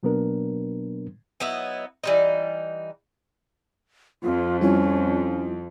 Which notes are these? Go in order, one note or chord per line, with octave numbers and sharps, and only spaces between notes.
B2 F#3 A#3 B3 D4 A#4
F#3 B3 D#4 E4
E3 G3 D#4
F2 F4
G3 C#4 E4 F4